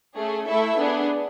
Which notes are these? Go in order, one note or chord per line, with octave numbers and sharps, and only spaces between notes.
A3 C#4 G#4
A3 E4 A4 E5
B3 D4 G#4